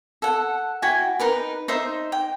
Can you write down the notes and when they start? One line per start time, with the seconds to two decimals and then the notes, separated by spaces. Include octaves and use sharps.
0.22 A4 F#5
0.82 E4 F#4 G5 G#5
1.19 D#4 A#4 B4
1.68 D#4 C5 E5 C6
2.12 G5